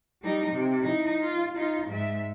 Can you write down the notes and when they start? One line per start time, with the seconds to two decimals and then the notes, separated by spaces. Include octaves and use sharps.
0.22 G3 D#4
0.52 C3
0.83 D#4 E4
1.20 F4
1.56 D#4 F4
1.88 G#2 E5